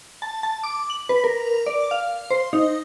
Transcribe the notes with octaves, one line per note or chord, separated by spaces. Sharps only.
A5
A5
D6
F#7
B4
A#4
D5
F5
C5
D#4